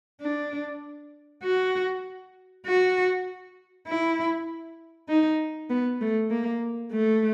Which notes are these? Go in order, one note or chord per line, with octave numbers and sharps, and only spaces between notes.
D4
F#4
F#4
E4
D#4
B3
A3
A#3
A3